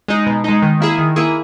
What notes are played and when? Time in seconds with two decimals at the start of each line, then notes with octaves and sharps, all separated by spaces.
0.08 G#3 D#4
0.26 B2
0.44 G#3 D#4
0.62 D#3
0.80 A#3 E4 G#4
0.98 D#3
1.16 A#3 E4 G#4